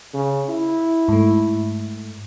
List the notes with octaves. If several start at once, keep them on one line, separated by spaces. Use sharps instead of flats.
C#3
E4
G#2 A3